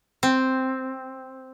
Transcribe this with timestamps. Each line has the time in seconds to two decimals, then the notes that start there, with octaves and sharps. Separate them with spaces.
0.23 C4